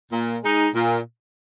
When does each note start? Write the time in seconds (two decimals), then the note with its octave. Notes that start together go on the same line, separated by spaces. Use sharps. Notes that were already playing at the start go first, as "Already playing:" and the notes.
0.11 A#2
0.43 G#3 D#4
0.74 A#2